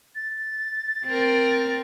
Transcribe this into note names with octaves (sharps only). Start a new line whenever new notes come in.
A6
C4 A#4